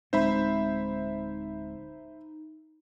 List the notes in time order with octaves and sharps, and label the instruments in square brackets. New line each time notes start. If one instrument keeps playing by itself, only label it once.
[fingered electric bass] D1 G#3 C4 [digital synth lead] D#4 [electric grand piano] C5 E5 B5